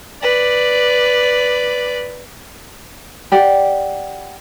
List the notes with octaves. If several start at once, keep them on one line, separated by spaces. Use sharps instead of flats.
B4 D5
G4 D5 F#5